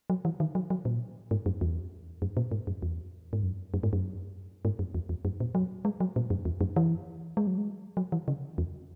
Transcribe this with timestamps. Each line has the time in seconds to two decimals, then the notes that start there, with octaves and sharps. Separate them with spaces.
0.10 F#3
0.25 E3
0.40 D#3
0.55 F#3
0.70 F#3
0.85 A#2
1.31 G#2
1.46 F#2
1.61 E2
2.22 F#2
2.37 A#2
2.52 G#2
2.67 F#2
2.82 E2
3.33 G#2
3.43 F#2
3.74 F#2
3.83 G#2
3.93 F#2
4.65 G#2
4.79 F#2
4.95 E2
5.09 E2
5.25 F#2
5.40 A#2
5.55 F#3
5.85 G#3
6.00 F#3
6.16 A#2
6.30 F#2
6.45 E2
6.61 F#2
6.76 E3
7.37 G#3
7.47 F#3
7.58 G#3
7.97 F#3
8.12 E3
8.28 C#3
8.58 E2